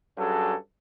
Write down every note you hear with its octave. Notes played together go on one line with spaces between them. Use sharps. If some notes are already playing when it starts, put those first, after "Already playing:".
G2 F#3 C#4 G#4 A4